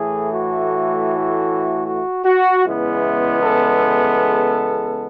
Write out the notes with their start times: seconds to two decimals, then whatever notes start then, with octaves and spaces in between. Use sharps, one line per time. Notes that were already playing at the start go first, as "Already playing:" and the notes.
Already playing: A2 E3 A3 G#4
0.30 F#4
1.86 F#4
2.25 F#4
2.64 E2 C#3 G#3 B3 E4
3.43 A4